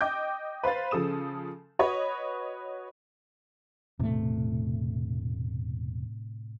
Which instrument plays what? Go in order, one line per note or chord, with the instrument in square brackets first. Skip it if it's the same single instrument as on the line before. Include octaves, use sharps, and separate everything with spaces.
[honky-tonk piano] D#5 G5 D6 G6
B4 C5 F5 A6
C#3 F3 A4 D#6 E7
F#4 B4 C#5 D#5
[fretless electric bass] E1 A3 [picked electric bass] A2 C3